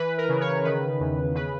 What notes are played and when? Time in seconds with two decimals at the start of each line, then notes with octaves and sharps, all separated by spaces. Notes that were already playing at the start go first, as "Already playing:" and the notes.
Already playing: E3 B4
0.18 A#4
0.29 C#3
0.40 C#5
0.64 D#3 B4
1.00 E2
1.35 C#3 B4